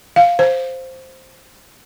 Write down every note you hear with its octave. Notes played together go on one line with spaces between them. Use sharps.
F5
C5